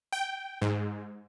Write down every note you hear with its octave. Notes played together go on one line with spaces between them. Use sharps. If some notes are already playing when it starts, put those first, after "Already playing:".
G5
G#2